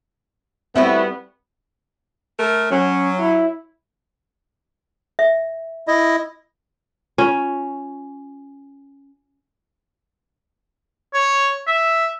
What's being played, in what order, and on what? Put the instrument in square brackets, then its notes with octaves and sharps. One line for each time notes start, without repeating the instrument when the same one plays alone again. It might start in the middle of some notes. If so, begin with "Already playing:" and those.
[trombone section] G3 B3 [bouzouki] A3 E4 F#4 [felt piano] C4
[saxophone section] A3 A#4
[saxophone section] F#3 [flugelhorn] C#4
[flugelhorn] E4
[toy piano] E5
[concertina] E4 D#5
[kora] C#4 [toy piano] F4 C#6
[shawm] C#5
E5